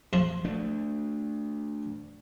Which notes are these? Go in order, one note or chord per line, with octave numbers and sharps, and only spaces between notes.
F2 F3
A3 D4